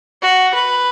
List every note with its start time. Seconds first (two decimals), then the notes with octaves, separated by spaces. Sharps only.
0.22 F#4
0.54 B4